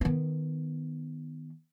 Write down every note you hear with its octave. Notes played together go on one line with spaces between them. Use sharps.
D#3 B3